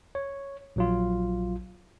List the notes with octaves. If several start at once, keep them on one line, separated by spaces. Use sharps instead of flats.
C#5
A#1 F#3 F4